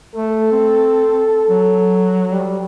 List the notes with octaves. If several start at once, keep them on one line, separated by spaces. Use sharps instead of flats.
A3 A4
C4
F#3
G3